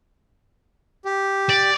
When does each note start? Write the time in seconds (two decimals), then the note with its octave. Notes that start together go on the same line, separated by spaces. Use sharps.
1.05 G4
1.50 D5